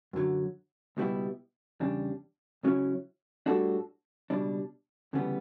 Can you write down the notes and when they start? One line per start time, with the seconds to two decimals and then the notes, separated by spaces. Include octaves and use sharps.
0.13 F#2 D3 F#3
0.97 C#2 B2 G3 B3 E4
1.80 E2 C#3 G3 D4
2.63 C#2 C#3 F#3 C#4 E4
3.46 A2 G3 D4 F#4 A4
4.30 C#2 B2 G3 D4
5.13 D2 C#3 E3 G3 B3